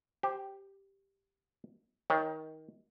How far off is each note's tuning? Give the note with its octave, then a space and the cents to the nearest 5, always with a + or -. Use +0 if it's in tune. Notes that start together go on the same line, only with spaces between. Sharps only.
G4 +0 C5 +0
D#3 +20 C#5 +0